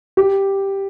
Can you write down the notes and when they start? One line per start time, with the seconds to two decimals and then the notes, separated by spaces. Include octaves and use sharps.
0.17 G4